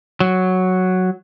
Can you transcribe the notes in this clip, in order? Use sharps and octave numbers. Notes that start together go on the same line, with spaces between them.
F#3